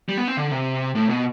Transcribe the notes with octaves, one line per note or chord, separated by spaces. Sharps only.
G3
B3
C4
D3
C3
A2
B2